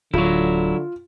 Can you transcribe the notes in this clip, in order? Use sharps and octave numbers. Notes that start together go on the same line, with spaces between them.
D1 D3 F#3 E4 F4